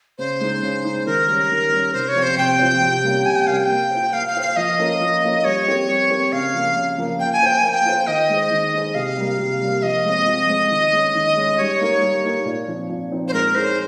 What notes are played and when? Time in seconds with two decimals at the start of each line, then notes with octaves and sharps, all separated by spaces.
0.18 C#3 C5
0.40 G#3 D#4
0.62 C#3
0.84 G#3 D#4
1.06 D#3 A#4
1.28 G3 C#4
1.50 D#3
1.72 G3 C#4
1.94 C3 C5
2.08 C#5
2.15 F3 C4
2.23 C5
2.38 C3 G5
2.59 F3 C4
2.81 C3
3.03 G3 A#3 C#4
3.25 C3 G#5
3.36 G5
3.47 G3 A#3 C#4 F5
3.57 G5
3.69 A#3
3.91 F4 C5
4.13 A#3 F5
4.28 F5
4.35 F4 C5
4.42 F5
4.56 F3 D#5
4.78 A#3 C#4 F4 A#4
5.00 F3
5.22 A#3 C#4 F4 A#4
5.44 G3 C#5
5.66 C4 G4 A#4
5.88 G3
6.10 C4 G4 A#4
6.32 C#3 F5
6.54 F3 A#3
6.75 C#3
6.98 F3 A#3
7.20 A#3 G5
7.33 G#5
7.41 F4 C5 G5
7.58 G#5
7.63 A#3
7.72 G5
7.85 F4 C5
8.07 D#3 D#5
8.29 G#3 D#4 G#4 C5
8.51 D#3
8.73 G#3 D#4 G#4 C5
8.94 C3 F5
9.17 G3 A#3
9.38 C3
9.61 G3 A#3
9.83 F3 D#5
10.04 G#3 C4
10.26 F3
10.49 G#3 C4
10.70 D#3
10.92 G#3 C#4
11.14 D#3
11.36 G#3 C#4
11.58 G3 C#5
11.80 A#3 D#4 A#4
12.01 G3
12.24 A#3 D#4 A#4
12.45 A#2
12.68 F3 C4 D#4
12.89 A#2
13.12 F3 C4 D#4
13.28 C5
13.33 G#3 A#4
13.55 D#4 G#4 C5 C#5